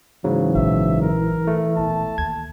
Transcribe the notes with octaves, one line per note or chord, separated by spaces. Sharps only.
G#2 C#3 E3 F#3
A#1 E5
A#4
A3
E1 A#1 A5
D#2 G#6